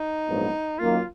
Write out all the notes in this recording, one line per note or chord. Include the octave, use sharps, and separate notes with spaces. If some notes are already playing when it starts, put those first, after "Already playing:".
Already playing: D#4
A#1 G#2 F#3 B3
F#2 D#3 A#3 F4